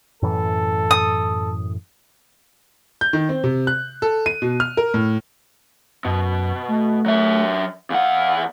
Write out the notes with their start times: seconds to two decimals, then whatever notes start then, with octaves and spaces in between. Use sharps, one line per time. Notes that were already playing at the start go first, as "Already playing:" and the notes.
0.23 F#2 A2 E3 A4
0.91 D#6
3.01 G6
3.13 D#3
3.29 C4
3.44 C3
3.67 F#6
4.02 A4
4.26 D#7
4.42 B2
4.60 F6
4.77 A#4
4.94 A2
6.05 F#2 B2
6.68 A3
7.06 F#3 E5
7.90 E2 F5 F#5